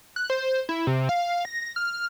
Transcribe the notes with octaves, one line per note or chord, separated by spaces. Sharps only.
F#6
C5
E4
C3
F5
A#6
F6